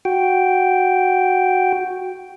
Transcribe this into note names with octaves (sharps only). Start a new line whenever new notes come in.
F#4 G5